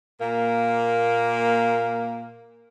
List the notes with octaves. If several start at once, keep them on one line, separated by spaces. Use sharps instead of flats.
A#2 A#3